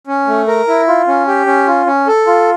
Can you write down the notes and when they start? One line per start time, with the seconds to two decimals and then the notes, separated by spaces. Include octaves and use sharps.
0.07 C#4
0.27 A3
0.48 A#4
0.68 E4
0.88 F4
1.07 C#4
1.27 G4
1.46 C#4
1.67 F4
1.86 C#4
2.07 A4
2.27 F4